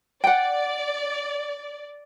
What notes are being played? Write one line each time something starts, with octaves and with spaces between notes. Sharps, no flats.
D5 F#5 G5